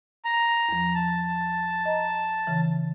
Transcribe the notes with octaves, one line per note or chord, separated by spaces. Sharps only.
A#5
E2 F3
A5
D#5 A#5
C#3 E3